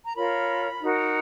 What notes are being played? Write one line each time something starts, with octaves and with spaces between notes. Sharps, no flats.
A#5
F4 A#4 C#5 B5
D#4 F#4 A#4